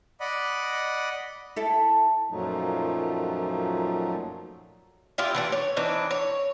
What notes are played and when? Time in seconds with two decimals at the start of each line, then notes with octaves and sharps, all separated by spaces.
0.20 D5 D#5 F#5 B5
1.56 E4 A4
2.29 F#2 A#2 F3 F#3 A3 D#4
5.18 E4 F4 G4
5.35 E3 A3 D4
5.52 C#5
5.76 E3 C4 D4 D#4
6.11 C#5